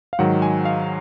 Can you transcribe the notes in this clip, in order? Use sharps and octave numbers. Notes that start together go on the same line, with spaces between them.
F5
G#2 D#3 F#3 F#5
G#5
F5